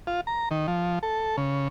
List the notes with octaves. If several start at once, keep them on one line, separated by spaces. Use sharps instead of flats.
F4
A#5
D#3
F3
A4
C#3